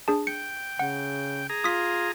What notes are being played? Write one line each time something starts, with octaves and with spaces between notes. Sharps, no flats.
D4 G#4 A5
G5 C#7
C#3 F#5
G#4 A#5
F4 D#6 B6